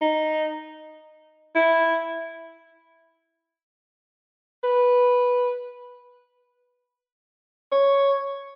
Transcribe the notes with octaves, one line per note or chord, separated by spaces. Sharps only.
D#4
E4
B4
C#5